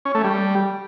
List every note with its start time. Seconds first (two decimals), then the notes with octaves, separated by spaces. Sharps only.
0.05 C#4
0.15 A3
0.24 G3